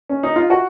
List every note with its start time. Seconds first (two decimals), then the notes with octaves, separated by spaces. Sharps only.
0.09 C#4
0.23 D#4
0.36 F4
0.50 F#4